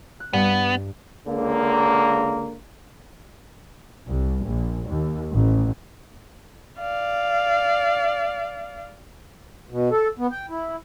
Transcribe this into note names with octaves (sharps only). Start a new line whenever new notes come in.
F#6
G2 B3
C#2 D3 A#3
C2
A#1
D#2
A1
D5 F5
B2
A4
B3
G5
E4